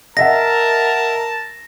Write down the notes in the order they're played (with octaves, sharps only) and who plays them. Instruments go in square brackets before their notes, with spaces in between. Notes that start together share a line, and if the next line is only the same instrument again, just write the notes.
[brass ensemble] A#4 [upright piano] D#5 E5 F#5 [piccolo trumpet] A5 [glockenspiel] A#6